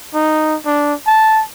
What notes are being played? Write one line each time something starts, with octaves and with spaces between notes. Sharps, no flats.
D#4
D4
A5